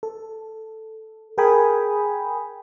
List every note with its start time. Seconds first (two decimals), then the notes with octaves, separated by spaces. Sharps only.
0.03 A4
1.38 G#4 A#4 G5 G#5 B5 D#6